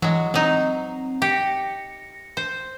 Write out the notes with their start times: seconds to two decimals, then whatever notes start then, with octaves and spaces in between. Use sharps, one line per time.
0.02 E3 F#3 G#3
0.34 F#3 C4 D#4
1.22 G4 A#6 C#7
2.37 C5